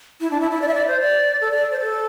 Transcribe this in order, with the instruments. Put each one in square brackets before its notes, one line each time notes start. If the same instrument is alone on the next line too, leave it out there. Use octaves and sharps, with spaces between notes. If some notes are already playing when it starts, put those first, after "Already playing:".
[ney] E4
D4
E4
E4
D5
E5
D5
C5
D5
A4
D5
C5
A4